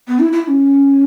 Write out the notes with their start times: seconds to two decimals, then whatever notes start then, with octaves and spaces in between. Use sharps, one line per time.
0.08 B3
0.19 E4
0.33 E4
0.44 E4
0.48 C#4